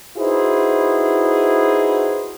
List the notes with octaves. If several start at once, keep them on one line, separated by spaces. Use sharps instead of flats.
D#4 E4 F#4 G#4 B4 C5